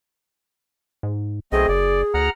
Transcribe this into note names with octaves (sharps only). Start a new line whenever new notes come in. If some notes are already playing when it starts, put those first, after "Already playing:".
G#2
B1 A3 C4 G#4 D#5
F#1 D5
D2 F#5 A#5 F6